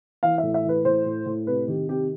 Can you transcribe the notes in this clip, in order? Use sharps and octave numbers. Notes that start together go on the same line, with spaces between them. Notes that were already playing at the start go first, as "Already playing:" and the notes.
E3 F5
A2 E5
E5
E3 B4
A2 C5
A2
A2
C3 B4
D#3 G4
C3 G4